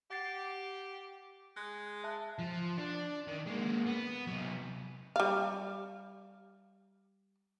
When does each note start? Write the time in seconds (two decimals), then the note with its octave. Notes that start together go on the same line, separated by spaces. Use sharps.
0.10 G4 F#5 A6 C7
1.56 G#3 F#6
2.04 E5 A5 F#6
2.39 F3
2.78 D4
3.28 D#3
3.47 G#3 A#3
3.86 B3
4.27 C3 F#3
5.16 G3 F5